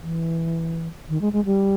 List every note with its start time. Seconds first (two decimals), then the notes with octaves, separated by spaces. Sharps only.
0.02 E3
1.09 D#3
1.21 G#3
1.33 G#3
1.45 G3